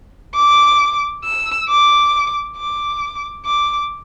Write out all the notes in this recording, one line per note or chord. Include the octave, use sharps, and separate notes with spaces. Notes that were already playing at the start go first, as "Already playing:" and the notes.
D6
E6
D6
D6
D6